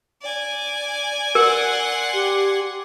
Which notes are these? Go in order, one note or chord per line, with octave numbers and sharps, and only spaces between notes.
D5 G#5
A#4 F#5 C6
G4